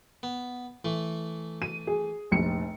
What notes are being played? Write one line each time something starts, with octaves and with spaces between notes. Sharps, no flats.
B3
E3 A3
D#7
G#4
F1 A#1 C#7